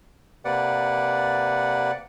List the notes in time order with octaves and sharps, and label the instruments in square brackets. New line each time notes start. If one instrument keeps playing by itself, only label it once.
[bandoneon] C3 A#3 B4 D5 F#5